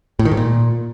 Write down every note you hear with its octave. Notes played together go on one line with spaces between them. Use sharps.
A2
D#3
G#2
A#2